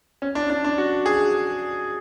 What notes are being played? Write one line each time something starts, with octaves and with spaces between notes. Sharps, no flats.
C#4
D4
D4
D4
F#4
G#4